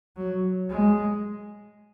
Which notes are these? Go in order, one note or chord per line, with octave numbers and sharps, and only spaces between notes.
F#3
G#3